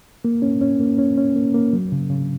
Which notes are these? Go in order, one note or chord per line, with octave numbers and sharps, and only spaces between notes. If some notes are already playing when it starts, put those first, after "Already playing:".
A#3
C#4
C#4
A#3
C#4
C#4
A#3
A#3
F#3
C#3
C#3